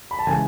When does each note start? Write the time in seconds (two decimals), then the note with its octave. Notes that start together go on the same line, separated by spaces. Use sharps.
0.11 B5
0.19 A5
0.27 C#3 E3 G#3 G#5